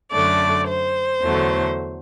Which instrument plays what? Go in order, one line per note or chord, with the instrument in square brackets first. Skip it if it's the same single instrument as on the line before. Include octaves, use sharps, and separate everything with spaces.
[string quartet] F#2 D3 A3 D5
C5
E2 D3 F#3 A3